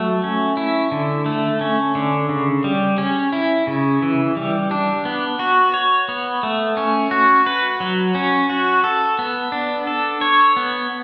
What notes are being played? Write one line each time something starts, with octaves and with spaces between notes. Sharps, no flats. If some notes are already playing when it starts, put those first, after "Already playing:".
Already playing: F#3 A3
C#4
E4
D3
A3
C#4
D3
C#3
G3
C#4
E4
C#3
E3
G3
D4
B3
F#4
C#5
B3
A3
C#4
F#4
B4
F#3
C#4
F#4
A4
B3
D4
A4
C#5
B3